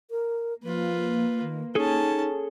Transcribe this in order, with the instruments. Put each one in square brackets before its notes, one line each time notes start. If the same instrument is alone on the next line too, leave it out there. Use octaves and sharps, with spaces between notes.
[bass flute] A#4
[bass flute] F3 [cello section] A#3 [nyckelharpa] F4 B4
[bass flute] D#3
[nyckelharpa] C#4 A5 [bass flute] D#4 [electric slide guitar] G#4 A4